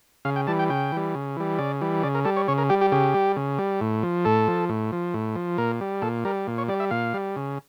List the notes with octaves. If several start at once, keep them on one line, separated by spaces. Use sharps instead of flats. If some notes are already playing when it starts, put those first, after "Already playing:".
C#3 F5
G5
E3 G3 A5
G5
C#3 G5
E3 G3
C#3
E3 G3
C#3 D5
E3 G3
C#3 D5
A#4
G3 A4
C#5
C#3 C#5
A#4
G3 G4
G4
C#3 G4
G3
C#3
G3
A2
F3
A2 A4
F3
A2
F3
A2
F3
A#2 A#4
G3
A#2 A4
G3 A#4
A#2
C#5
G3 D5
E5
A#2 F5
G3
C#3